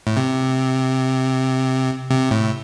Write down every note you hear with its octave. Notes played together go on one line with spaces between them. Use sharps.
A2
C3
C3
A2